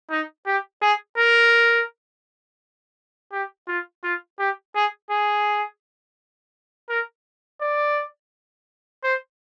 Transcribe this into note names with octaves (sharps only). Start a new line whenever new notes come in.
D#4
G4
G#4
A#4
G4
F4
F4
G4
G#4
G#4
A#4
D5
C5